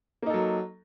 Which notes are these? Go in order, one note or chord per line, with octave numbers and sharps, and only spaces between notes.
F#3 A#3 D#4 A4